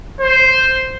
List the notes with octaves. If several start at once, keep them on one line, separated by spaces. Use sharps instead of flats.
C5